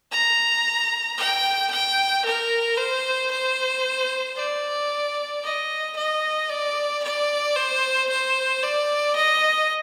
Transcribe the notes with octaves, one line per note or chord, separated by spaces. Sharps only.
A#5
G5
G5
A#4
C5
C5
D5
D#5
D#5
D5
D5
C5
C5
D5
D#5